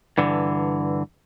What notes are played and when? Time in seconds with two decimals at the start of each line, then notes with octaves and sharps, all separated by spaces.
0.18 G2 D3 E3